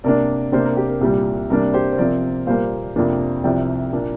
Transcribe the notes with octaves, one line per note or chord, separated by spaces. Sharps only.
C3 A#3 D4 A#4 D5
C3 A#3 D4 G4 C5
A#4
G4
A#4
C2 A#2 G3 G4
C3 G3 A#3 D4 A#4
G4 C5
C5
C3 F3 C4 A#4 D5
A#2 G3 A#3 C5 F5
F2 C3 F3 A#3 D4
C2 C3 F3 D5 G5
A#2 A#3 D4